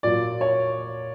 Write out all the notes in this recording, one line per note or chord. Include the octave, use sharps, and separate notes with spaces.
A#2 F#3 D5
C#5